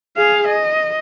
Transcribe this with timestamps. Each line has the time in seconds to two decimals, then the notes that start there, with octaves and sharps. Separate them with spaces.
0.17 G#4 F5
0.48 D#5